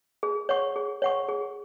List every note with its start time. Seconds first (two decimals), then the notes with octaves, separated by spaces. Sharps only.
0.23 G#4
0.49 C#5 F#5 C#6
0.76 G#4
1.02 C#5 F#5 C#6
1.28 G#4